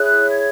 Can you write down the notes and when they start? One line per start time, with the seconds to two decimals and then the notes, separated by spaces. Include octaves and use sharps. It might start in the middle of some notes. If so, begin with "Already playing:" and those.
Already playing: E4 G#4 C#5 F#6
0.31 G#6